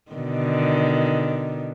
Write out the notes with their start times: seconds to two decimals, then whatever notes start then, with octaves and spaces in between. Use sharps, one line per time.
0.12 B2 D3 D#3